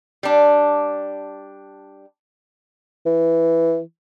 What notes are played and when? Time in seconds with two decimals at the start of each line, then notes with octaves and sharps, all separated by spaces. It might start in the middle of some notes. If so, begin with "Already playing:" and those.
0.23 G3 D4
3.06 E3